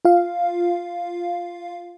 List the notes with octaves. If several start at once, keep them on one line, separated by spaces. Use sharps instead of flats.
F4 F5